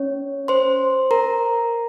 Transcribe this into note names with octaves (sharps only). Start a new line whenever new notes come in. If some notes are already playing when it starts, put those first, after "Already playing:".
Already playing: C#4 C#5
C5 C6
A#4 A#5